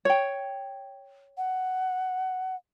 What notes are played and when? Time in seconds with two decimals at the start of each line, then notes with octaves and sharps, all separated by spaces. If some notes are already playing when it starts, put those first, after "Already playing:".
0.05 C#5 G5
1.37 F#5